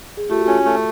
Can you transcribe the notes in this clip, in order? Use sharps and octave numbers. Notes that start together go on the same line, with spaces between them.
G#4
A3 F4 G4
F#4
C#4 F4 G4
A3